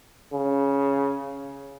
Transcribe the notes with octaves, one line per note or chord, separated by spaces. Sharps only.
C#3